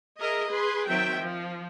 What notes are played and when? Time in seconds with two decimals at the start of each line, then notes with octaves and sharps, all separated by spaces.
0.19 G#4 A#4 D#5 E5
0.48 G#4 B4 C6
0.87 D#3 F#3 C4 E5 G5
1.20 F3